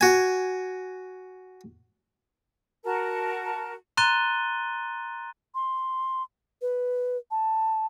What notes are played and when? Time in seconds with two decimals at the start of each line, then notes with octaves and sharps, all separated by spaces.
0.01 F#4 G#5
2.85 F#4 A#4 A5 A#5
3.97 A#5 C6 F#6 A6 D#7 G7
5.55 C6
6.62 B4
7.31 A5